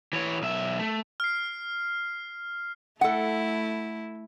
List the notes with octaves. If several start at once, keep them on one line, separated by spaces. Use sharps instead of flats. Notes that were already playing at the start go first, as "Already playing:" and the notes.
E3 C#5
B1 E5
A3
F6 C7
A3 E4 A4 F#5